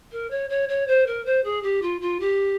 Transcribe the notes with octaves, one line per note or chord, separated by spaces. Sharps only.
A#4
C#5
C#5
C#5
C5
A#4
C5
G#4
G4
F4
F4
G4